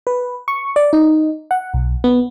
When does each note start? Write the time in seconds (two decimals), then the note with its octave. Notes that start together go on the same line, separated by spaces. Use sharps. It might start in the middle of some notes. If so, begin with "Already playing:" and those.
0.07 B4
0.48 C#6
0.76 D5
0.93 D#4
1.51 F#5
1.74 B1
2.04 B3